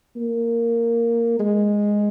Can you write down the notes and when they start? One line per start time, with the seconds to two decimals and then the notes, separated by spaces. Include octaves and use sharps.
0.17 A#3
1.40 G#3